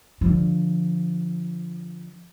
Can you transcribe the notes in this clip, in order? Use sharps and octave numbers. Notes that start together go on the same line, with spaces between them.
D3 F3